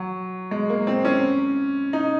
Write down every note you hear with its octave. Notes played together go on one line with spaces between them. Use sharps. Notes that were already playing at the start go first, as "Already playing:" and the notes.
Already playing: F#3
G#3
A#3
C4
C#4
D#4